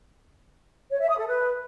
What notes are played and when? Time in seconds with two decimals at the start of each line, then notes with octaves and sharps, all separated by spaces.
0.91 C#5
1.00 E5
1.09 D#6
1.18 A4
1.27 B4